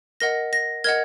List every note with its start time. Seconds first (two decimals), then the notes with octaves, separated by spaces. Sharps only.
0.20 A#4 D#5 F#5 A#6
0.53 A#6
0.84 A#4 D#5 F#5 G#6